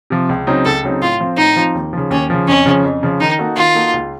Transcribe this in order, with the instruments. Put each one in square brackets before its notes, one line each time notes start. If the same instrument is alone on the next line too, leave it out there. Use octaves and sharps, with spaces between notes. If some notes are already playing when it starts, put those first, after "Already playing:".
[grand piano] C3 F3
C#2
C#3 F#3 C4 D#4
[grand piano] C#2 [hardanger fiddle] A4
[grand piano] C#3 F#3 C4 D#4
[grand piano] A2 [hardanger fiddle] F4
[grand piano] F3 C4 F4 C5
[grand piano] A2 [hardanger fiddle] D#4
[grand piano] F3 C4 F4 C5
D#2
C#3 F3
[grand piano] D#2 [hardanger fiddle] C#4
[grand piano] C#3 F3
[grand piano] F2 [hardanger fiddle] C#4
[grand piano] C#3 F3
F2
C#3 F3
[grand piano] D#3 [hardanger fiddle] D#4
[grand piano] A#3 D#4 F#4 A4
[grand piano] D#3 [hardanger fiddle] F4
[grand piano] A#3 D#4 F#4 A4
C#2